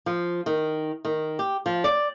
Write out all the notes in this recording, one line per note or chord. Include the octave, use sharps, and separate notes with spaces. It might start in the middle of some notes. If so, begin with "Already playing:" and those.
F3
D#3
D#3
G4
F3
D5